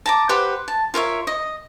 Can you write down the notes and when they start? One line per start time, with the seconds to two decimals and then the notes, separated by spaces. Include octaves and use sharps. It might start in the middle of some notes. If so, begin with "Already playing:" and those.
0.06 A5 A#5 D6
0.29 G4 B4 C5 F#5
0.68 A5
0.94 F4 A#4 C#5 E5
1.27 D#5